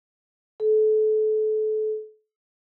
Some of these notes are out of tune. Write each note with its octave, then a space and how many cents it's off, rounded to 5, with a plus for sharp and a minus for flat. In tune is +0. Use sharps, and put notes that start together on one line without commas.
A4 -30